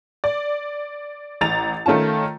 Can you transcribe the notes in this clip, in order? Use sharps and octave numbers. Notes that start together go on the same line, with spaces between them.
D5
A1 A#5 A6 F7
D#3 A3 C#4 F4 A5